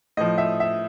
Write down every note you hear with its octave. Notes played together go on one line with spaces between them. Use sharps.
A2 F3 D#5
E5
E5